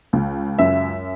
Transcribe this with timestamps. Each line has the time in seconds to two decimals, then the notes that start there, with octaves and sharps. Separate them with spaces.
0.13 C#2
0.59 F#2 E5